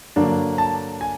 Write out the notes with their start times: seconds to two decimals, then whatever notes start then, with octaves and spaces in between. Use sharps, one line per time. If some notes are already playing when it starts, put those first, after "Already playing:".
0.16 G2 D3 F#3 A#3 D4
0.58 A5
1.01 G#5